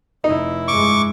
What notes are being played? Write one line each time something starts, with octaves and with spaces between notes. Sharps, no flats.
F1 D#4 E4
G2 G#3 C#6 D6